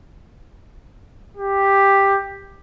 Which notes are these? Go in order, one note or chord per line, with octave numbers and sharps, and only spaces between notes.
G4